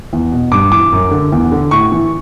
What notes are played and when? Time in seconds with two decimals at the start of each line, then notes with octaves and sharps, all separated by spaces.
0.13 E2
0.32 B2
0.52 G2 D6
0.72 E3 D6
0.92 F#2
1.11 D3
1.32 E2
1.52 D3
1.71 A2 C#6
1.92 E3